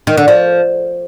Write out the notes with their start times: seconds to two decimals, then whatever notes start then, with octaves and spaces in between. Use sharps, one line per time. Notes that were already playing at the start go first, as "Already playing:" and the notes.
0.07 D#3
0.17 D3
0.28 F3